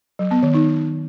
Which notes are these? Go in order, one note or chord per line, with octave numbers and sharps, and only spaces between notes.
F#3
B3
D#3
D#4